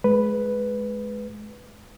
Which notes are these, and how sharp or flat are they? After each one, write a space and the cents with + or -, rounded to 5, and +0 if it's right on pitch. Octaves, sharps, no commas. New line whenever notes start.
G#3 +25 B4 +0